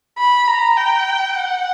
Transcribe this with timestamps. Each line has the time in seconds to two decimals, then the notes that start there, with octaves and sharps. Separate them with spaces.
0.18 B5
0.47 A#5
0.77 G5
1.36 F#5